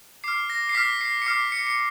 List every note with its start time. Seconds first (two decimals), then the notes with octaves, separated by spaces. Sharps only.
0.24 D6 F6 C7
0.50 A#6
0.69 C7
0.75 D6 F6 B6
1.01 C7
1.22 C#7
1.26 D6 F6 C7
1.52 C#7
1.67 C#7